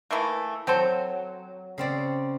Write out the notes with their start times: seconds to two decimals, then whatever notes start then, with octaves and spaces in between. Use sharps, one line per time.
0.11 E3 A3 A#3
0.67 F#3 C4 A4 C5
1.78 C#3 C4 D5